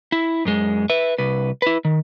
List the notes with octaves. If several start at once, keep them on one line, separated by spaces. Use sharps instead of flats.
E4
F#2 G#3
B4 E5
C2 B4
E4 B4
D#3